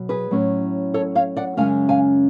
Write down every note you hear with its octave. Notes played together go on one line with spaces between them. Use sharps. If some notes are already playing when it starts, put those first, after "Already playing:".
Already playing: B2 F#3
G#4 B4
A2 F#3 C#4
A4 C#5
C#5 F5
D5 F#5
F#2 C#3 G#3 C#4 F5 G#5
F5 G#5